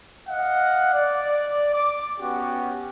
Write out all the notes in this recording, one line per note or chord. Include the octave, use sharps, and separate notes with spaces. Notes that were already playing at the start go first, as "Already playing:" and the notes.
D#5 F5 F#5
D5
D6
B3 C#4 F#4 G4